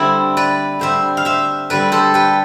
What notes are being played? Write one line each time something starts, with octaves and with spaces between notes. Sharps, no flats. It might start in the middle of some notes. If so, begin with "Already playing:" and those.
Already playing: D3 G3 C4 E4
B4 D5
D3 G3 C4 C5 E5
F5
C5 E5
D3 G3 C4 B4 D5
A4 C5
G4 B4